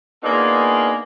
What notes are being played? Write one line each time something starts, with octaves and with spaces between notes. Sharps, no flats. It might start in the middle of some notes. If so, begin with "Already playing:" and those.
A#3 B3 D4 D#4 F4 G#4